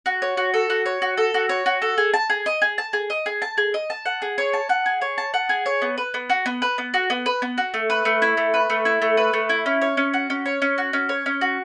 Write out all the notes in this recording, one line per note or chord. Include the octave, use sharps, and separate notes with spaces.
F#4
C#5
F#4
A4
F#4
C#5
F#4
A4
F#4
C#5
F#4
A4
G#4
A5
G#4
D#5
G#4
A5
G#4
D#5
G#4
A5
G#4
D#5
A5
F#5
G#4
C#5
A5
F#5
G#4
C#5
A5
F#5
G#4
C#5
B3
B4
B3
F#4
B3
B4
B3
F#4
B3
B4
B3
F#4
A3
B4
A3
E4
A3
B4
A3
E4
A3
B4
A3
E4
C#4
C#5
C#4
F#4
C#4
C#5
C#4
F#4
C#4
C#5
C#4
F#4